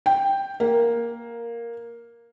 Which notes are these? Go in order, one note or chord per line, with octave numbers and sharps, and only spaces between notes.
G5
A#3